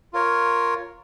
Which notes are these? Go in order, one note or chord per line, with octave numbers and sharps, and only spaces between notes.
F4 A#4 C#5